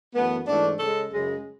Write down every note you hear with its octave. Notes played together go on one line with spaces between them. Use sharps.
F#2 E3 A3 B3
G#2 E3 A3 D4
C#3 G#3 A4
F#2 C#3 G#3